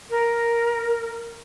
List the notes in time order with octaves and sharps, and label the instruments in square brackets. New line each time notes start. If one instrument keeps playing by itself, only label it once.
[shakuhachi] A#4